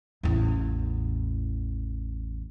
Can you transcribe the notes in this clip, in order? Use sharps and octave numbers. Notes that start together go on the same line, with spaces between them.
A1 E2